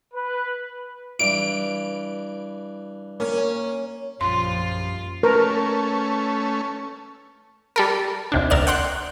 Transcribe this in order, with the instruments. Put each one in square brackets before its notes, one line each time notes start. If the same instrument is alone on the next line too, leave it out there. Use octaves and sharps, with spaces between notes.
[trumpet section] B4
[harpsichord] G2 E3 [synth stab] D7
[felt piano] A#3 [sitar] C#4
[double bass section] A#1 F3 G3 [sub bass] F#2 [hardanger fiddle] F4 [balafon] C6
[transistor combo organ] A3 C#4 [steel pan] A#4 [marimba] B4
[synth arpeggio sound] G3 A4 A#4
D#2 C3 D4
D2 A#4 D5 E7
F#5 G5 C6 F#6